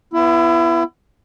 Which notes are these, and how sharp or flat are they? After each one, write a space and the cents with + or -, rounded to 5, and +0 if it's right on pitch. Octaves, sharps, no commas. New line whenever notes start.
B3 +0 E4 +30